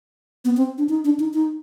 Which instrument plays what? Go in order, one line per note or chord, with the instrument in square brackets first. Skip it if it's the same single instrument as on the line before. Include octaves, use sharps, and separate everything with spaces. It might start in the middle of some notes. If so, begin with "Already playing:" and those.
[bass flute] B3
C4
D4
D#4
D4
D#4
D#4